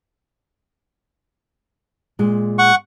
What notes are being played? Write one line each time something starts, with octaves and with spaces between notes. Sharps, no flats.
A#2 G#3
F#5 C#6